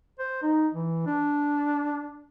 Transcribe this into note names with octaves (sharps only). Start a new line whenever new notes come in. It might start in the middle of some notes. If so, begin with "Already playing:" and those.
C5
D#4
E3
D4